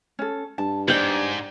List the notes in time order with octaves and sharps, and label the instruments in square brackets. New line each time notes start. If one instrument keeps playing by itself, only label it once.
[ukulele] C#4 A4
[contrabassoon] G2 [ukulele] A5
[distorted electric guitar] G#2 [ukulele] C5 D#5 [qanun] D5 G5